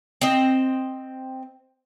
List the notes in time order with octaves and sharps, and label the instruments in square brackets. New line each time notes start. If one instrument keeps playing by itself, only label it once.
[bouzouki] C4 D#5